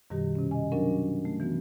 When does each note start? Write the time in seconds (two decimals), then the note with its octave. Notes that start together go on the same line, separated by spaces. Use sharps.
0.10 F#2 B2 D#3 G3 G4
0.35 C3 C#4
0.51 D#5 G#5
0.72 F#3 C#4 D4 F#4 A#4
1.25 A3
1.40 E3 B3 F#4